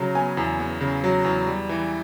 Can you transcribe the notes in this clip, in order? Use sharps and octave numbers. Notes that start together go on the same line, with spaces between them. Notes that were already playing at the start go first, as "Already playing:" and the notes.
Already playing: C#3 F#3 A#5
B3 G#5
E2
B3
C#3
F#3
E2
G3
E3